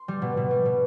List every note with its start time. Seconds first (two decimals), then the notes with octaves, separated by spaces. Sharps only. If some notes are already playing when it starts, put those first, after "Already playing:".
Already playing: C6
0.08 G3
0.22 B2
0.37 B2
0.51 G3
0.65 B2